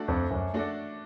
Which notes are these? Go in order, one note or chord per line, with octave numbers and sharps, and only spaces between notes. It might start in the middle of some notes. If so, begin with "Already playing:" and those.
Already playing: A3 D4 F#4 A4 D5
F2
F#2
A3 D4 F#4 A4 D5